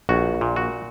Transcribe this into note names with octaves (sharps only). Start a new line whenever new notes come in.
A#1 F#4
A#2
F#4